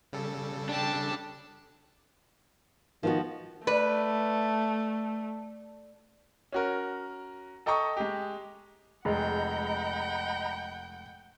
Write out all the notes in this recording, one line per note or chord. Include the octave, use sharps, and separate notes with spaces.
C#3 G3 A4
D4 G4 A5
D#3 F3 B3 F#4
A3 B4 D5
C#4 F#4 A#4
A4 D#5 G5 A#5 C#6 D#6
G#3 G4
F1 G#3 D#5 F#5 G5 A#5 B5